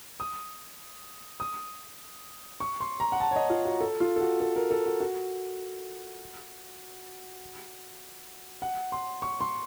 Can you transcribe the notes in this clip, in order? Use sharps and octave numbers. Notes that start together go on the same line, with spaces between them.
D#6
D#6
C#6
C6
A#5
F#5
A5
C#5
D#5
F4
F#4
A4
F4
A4
F#4
A4
A#4
A4
F#4
F#4
F#5
C6
C#6
C6